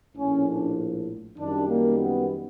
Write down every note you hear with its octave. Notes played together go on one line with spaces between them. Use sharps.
A#1 A2 F3 C#4
D4
F#2 D#3 G3 D4
A#3
B3